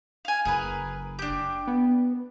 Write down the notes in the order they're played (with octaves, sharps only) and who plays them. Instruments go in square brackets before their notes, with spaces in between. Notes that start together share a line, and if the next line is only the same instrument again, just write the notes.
[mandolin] F5 G#5
[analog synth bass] F#1 [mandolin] G#4 A#4 B4
[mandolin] D4 G4
[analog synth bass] B3